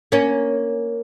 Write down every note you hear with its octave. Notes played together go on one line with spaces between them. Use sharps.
A#3 C#4